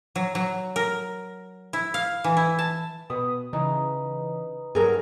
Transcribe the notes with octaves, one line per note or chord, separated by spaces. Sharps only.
F#3
F#3
A#4
E4
F5
E3
E4
A5
B2 B4 D#6
C#3 E3 D#4
G2 F#3 G#4 A#4